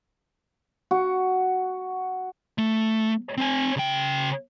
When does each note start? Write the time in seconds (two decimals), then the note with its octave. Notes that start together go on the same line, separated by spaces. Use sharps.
0.91 F#4
2.58 A3
3.37 C4 G#5
3.76 C#3 G5